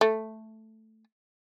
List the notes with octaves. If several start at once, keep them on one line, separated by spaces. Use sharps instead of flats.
A3